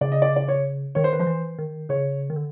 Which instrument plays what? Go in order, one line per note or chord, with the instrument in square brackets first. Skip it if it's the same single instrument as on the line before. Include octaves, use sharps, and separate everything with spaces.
[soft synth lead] C#3 [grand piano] D5
[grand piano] D#5
D5
D5
C#5
[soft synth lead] D#3 [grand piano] C#5
[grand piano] C5
B4
[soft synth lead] F3 [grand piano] C5
[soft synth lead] E3
D#3
[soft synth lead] C#3 [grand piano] C#5
[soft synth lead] D#3
D3